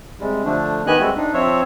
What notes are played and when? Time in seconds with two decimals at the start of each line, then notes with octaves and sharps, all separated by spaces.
0.20 C3 G3 G#3
0.45 D3 F3 A3 D4
0.87 D#3 B3 G4 D#5 G#5 F#6
1.00 G3 G#3 C4 F#4 E5
1.16 D4 D#4
1.34 F3 C4 C5 C#5 E5